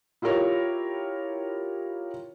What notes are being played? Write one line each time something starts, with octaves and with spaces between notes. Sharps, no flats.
E4 F4 G4 A#4 C#5